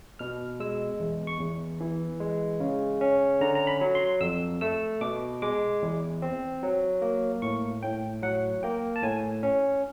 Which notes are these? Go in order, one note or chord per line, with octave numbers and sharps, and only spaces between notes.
B2 F6
G#3 E6
E2
C#6
E2
E3
G#3
C#3
C#4
D3 A#5
A#5
B5
F#3
C6
F2 E6
A3 E6
B2 D6
G#3 D6
E2
C4
F#3
A#3
A2 C#6
A2 G5
F#3 F#5
A#3 G5
A5
A2 G#5
C#4